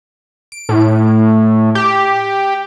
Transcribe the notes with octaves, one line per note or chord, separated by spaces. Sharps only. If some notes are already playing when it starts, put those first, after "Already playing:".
D7
A2
G4